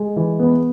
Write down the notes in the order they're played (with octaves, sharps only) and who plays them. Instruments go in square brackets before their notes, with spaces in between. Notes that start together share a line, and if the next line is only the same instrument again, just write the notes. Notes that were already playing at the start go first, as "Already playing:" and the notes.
Already playing: [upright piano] G#3
E3
B3